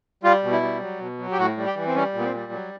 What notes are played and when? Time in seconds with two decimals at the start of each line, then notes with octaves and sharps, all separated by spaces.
0.23 G3 F4
0.43 B2
0.52 E4
0.62 G3
0.81 F#3
1.00 B2
1.19 F#3
1.32 G4
1.38 A2 F#4
1.57 G3
1.66 G4
1.76 E3
1.87 C4
1.95 G3 C#4
2.14 A#2
2.19 B3
2.24 C4
2.34 G3
2.52 F#3